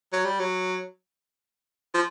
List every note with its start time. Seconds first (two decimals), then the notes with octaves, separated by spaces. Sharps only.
0.13 F#3
0.26 G3
0.40 F#3
1.94 F3